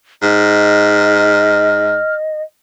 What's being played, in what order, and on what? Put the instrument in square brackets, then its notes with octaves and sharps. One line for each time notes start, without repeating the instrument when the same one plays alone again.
[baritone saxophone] G#2 [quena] D#5 [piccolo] F6